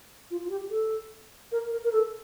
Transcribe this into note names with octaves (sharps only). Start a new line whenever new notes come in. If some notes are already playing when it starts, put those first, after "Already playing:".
F4
F4
G4
A4
A#4
A#4
A#4
A4